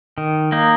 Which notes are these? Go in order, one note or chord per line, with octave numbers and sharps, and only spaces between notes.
D#3
A#3 D#4